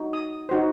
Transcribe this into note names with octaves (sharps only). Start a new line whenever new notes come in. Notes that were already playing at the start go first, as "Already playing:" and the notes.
Already playing: D#4 F#4
D#6
D#4 F#4 C5